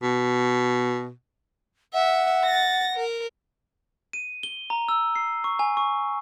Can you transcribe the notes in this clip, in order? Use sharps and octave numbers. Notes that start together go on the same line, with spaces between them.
B2
E5 F#5
A6 A#6
A#4
D#7
G7
A#5
E6
C7
C#6
G#5
C#6